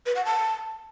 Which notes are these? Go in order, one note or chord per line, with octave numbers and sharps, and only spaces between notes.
B4
F#5
A5